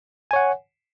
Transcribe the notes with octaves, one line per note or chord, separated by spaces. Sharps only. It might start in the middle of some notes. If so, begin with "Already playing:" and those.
C#5 F#5 G#5